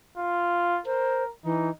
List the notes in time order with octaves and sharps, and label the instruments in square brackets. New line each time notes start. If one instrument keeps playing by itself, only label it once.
[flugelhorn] F4
[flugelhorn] A#4 [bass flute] C5
[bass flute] E3 [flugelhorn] D#4